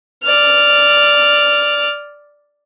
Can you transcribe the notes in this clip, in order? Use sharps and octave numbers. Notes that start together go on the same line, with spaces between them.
D5 F6